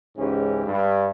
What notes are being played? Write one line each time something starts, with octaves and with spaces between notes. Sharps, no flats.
C#2 G#2 E3 C#4 G4
G2